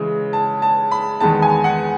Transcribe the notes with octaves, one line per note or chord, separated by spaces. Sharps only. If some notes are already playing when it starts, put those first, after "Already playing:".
Already playing: C#3 E3 G#3
A5
A5
B5
E2 D#3 G#3 B3 A5
G#5
F#5